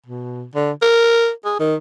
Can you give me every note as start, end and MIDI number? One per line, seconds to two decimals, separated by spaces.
0.06 0.44 47
0.55 0.72 50
0.82 1.31 70
1.45 1.58 68
1.60 1.75 51